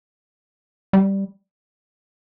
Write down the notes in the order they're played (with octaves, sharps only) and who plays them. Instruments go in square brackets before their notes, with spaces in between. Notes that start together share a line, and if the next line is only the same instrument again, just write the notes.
[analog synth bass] G3